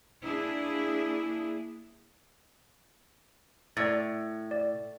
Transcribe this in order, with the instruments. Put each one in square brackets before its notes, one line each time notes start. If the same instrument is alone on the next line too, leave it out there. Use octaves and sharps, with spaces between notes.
[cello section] A#3 D4 E4 G#4
[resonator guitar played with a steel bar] A2 [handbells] D5 A6
[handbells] D5